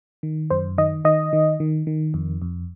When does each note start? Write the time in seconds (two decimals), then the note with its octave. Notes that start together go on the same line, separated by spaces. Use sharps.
0.23 D#3
0.50 F#2 C5
0.78 D#3 D#5
1.05 D#3 D#5
1.33 D#3
1.60 D#3
1.87 D#3
2.14 F2
2.42 F2